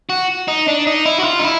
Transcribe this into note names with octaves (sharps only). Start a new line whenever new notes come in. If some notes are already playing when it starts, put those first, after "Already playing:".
F#4
D#4
D4
D#4
E4
F#4
F4
D#4
E4